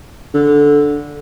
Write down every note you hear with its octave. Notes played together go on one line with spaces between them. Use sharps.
D3